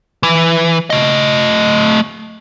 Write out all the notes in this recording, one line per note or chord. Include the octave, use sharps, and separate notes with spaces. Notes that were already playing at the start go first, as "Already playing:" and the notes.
E3
A3 D#5